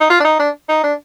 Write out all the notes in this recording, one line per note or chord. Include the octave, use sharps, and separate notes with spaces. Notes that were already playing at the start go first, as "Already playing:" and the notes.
D#4
F4
D4
D#4
D4
D#4
D4